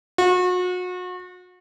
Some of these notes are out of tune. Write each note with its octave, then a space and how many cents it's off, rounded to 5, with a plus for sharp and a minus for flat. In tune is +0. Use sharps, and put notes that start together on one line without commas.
F#4 -35